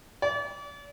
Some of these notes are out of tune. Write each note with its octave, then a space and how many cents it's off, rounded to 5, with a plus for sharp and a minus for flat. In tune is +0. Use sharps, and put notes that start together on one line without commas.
D5 -40